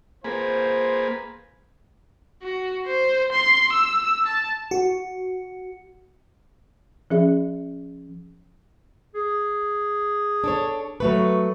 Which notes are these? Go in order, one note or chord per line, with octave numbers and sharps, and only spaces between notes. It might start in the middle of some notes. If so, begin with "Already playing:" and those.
A#3 F4 G#4 B4 C5
F#4
C5
C6
E6
A5
F#4
F3 C#4 G#4 E5
G#4
D4 A4 C#5
F#3 A3 B4 C#6